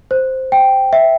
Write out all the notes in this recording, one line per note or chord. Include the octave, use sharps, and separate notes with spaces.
C5
G5
E5